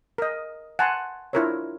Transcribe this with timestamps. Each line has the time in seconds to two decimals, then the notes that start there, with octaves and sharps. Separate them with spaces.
0.18 A#4 D#5
0.79 F#5 G#5 A5 B5 C6
1.33 D4 E4 F4 A#4 C5 C#5